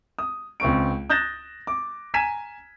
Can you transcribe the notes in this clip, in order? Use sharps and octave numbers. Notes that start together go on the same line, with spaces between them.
D#6
C#2 C4 C#6 D7
D#6 F#6 G6 A6 A#6 E7
D6
G#5 A#5 G#6 B6 D#7 E7